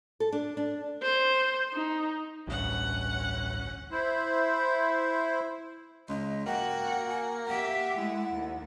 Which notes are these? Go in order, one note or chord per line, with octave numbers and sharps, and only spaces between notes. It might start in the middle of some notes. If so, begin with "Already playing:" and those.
A4
D4
D4
C5
D#4
A1 D2 G2 C#4 F#5
E4 C5
C#2 D#5
A#3 F#4 F#5 G5
G#5
G4 E5 F#5
G#3 A3 E4
D#2